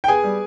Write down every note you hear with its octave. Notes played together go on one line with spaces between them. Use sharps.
G5
B3 G#4 G#5
G3